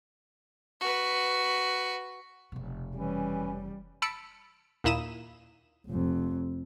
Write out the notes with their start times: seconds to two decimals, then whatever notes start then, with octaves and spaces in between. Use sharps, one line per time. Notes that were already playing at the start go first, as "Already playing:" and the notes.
0.81 F#4 B4
2.52 F1 B2
2.96 E3 G3 C#4
4.02 A5 B5 E6 C#7 D7
4.84 D#2 A#2 E4 D#6 E7
5.87 F1 F2